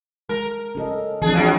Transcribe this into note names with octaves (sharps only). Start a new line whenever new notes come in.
G#3 A#4
C#4 A4 D#5
E3 F3 C4 D4 G#4
F#3 G#3 D4 G#4 F5